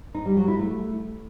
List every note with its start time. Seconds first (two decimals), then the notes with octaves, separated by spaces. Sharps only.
0.14 D#4
0.26 G3
0.37 F#3
0.48 E4
0.59 A3